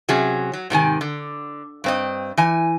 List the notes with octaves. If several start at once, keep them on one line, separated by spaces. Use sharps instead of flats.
C3 F#3 C#4 G#4
F#3
G#2 C3 D#3 G#5
D3
G2 C4 D#5
E3 G#5